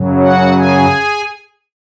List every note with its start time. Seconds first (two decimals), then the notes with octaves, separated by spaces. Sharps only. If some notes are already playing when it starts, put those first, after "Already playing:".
Already playing: F#2 C#3 F#3
0.20 F#4 F#5
0.57 G#4 G#5